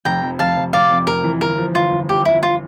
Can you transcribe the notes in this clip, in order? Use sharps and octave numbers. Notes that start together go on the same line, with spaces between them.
F1 G5 A#5
F2
F1 F5 A5
F1
F1 D5 F5
F2
F1 A#4
E3
G1 A#4
F3
G1 F4
G1
G1 G4
G1 E4
F4